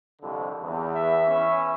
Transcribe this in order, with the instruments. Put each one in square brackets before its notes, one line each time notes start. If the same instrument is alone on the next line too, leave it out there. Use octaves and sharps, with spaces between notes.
[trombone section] C2 F2 D3
E2
[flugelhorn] E5
[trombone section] E3 C#4